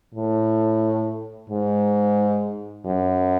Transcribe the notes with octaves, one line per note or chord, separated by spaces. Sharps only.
A2
G#2
F#2